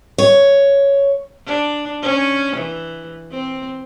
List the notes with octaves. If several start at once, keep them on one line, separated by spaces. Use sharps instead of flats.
C#5
D4
C#4
E3
C4